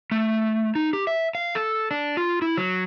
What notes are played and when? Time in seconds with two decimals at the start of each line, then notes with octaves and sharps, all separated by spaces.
0.11 A3
0.75 D#4
0.93 G4
1.07 E5
1.35 F5
1.55 A4
1.91 D4
2.17 F4
2.42 E4
2.57 F#3